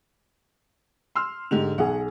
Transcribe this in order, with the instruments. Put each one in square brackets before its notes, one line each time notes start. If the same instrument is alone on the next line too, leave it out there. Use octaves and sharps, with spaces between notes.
[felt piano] C6 E6 F6
[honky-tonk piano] G#2 G4 F7 [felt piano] D3
[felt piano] B1 G#4 [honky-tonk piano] F#5